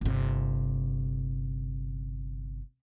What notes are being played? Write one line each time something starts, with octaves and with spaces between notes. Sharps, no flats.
G1 C3